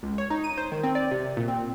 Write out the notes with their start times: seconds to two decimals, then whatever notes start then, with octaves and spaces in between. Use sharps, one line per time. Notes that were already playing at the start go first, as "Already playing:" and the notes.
0.03 C#2
0.18 C#5
0.30 D#4
0.44 D#7
0.57 C5
0.72 D#3
0.84 C4
0.95 D5
1.11 C3
1.37 A#2
1.48 C4